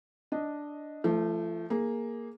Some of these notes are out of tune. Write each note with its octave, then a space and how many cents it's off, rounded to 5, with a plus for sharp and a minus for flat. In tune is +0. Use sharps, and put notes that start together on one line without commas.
D4 +0 D#5 +0
F3 -40 A3 +0
A#3 +0 G#4 +0